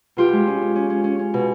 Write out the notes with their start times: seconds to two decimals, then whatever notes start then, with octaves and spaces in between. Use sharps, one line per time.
0.17 B2 F4 G4
0.33 G#3
0.47 C#4
0.62 C#4
0.75 C#4
0.90 C#4
1.04 C#4
1.19 C#4
1.34 B2